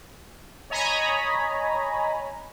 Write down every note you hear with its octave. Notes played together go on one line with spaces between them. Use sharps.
C#5 D#5 G#5 A#5 B5